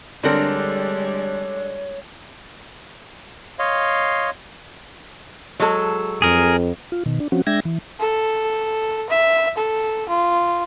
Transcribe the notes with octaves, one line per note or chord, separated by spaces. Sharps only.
D3 G3 G#3 C4 D4 A4 A#4 C#5
C#5 D#5 F5 C6
F#3 G#3 A4
F2 G#4 A#4
F4
B2 D#3
D4
F3 C4 C#4 F#4
G#3 D4 E5 G5 G#6 A#6
E3
A4
E5
A4
F4